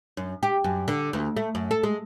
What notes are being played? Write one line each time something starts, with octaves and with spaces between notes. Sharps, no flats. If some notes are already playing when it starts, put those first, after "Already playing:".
F#2
G4
F#2
D3
D2
A3
F#2
A4
G#3